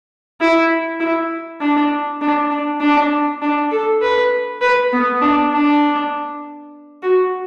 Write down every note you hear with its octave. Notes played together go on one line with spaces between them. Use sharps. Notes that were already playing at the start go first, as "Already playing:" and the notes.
E4
E4
D4
D4
D4
D4
D4
A4
B4
B4
B3
D4
D4
F#4